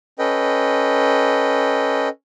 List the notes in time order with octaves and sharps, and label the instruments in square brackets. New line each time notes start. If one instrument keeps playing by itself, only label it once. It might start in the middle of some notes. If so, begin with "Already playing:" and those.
[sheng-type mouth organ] C#4 A4 B4 D#5 G5